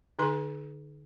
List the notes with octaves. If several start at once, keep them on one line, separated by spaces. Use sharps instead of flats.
D3 D#4 B4 C6